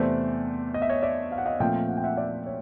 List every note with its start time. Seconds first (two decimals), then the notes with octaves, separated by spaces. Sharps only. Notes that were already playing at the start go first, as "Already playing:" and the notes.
Already playing: E2 C3 E3 A3 C4 C5 D5
0.74 D#5
0.82 E5
0.89 C#5 D#5
1.03 D5 E5
1.32 F5
1.38 F#5
1.46 D#5 F5
1.60 A#2 F3 A3 C4 F5 G5
1.89 F#5
1.97 G5
2.04 E5 F#5
2.17 D5 E5
2.46 C#5